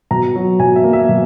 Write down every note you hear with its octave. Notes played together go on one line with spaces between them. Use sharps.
B2 A#5
F#3
B2 G#5
E5
A#3
E5
B2